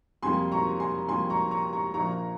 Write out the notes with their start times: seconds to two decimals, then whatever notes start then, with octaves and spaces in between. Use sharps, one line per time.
0.23 F2 C3 G3 A#3 G#5 C6
0.52 A#5 C#6
0.80 G#5 C6
1.08 F2 C3 G3 A#3 G#5 C6
1.30 A#5 C#6
1.51 A#5 C#6
1.73 A#5 C#6
1.94 A#1 A#2 F3 A#3 A#5 C#6